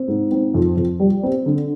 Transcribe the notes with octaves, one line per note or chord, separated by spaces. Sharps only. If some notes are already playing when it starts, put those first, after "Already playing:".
Already playing: C4
G#2
C4
F2
F2
G3
C4
D3